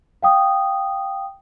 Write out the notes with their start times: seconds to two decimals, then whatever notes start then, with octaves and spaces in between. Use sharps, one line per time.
0.23 F5 G5 D#6